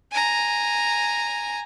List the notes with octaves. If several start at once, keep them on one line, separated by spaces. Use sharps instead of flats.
G#5 A#5